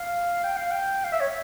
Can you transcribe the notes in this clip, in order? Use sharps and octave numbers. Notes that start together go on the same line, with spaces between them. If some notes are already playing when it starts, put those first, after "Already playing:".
Already playing: F5
G5
F5
G5
F5
E5
C#5
E5